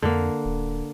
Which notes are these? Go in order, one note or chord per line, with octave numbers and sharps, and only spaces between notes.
F2 D3 A#3
D1